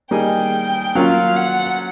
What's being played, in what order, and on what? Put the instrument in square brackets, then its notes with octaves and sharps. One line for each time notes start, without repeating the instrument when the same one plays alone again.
[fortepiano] G3 A#3 D#4 G#4 [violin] G5
[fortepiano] F#3 A#3 C#4 F4 [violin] F5
[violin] F#5